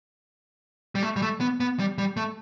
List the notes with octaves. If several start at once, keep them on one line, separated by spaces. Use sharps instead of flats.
G3
A3
G3
A3
B3
B3
G3
G3
A3